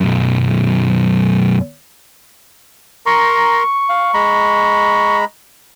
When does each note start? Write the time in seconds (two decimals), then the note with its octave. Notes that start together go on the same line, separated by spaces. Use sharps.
0.01 B1 F#2
3.06 A#4 A#5 C6 C#6
3.89 F5
4.14 G#3 A#5 B5